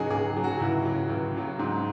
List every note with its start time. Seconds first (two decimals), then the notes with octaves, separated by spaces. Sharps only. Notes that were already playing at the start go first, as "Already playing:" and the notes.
Already playing: C#2 C#3 F#3 D#4 F#4 G#4
0.10 C#2 G#4
0.35 C#3 F#3
0.44 F#4
0.60 C#2 E4
0.85 C#3 F#3
1.10 C#2
1.35 C#3 F#3
1.59 G#2